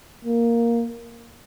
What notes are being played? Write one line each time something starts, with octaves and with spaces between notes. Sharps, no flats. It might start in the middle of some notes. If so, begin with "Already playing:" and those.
A#3